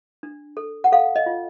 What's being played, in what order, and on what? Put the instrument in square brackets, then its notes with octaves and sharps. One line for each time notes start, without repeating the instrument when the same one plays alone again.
[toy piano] D4
A4
F#5
A4 F5
D#5
F4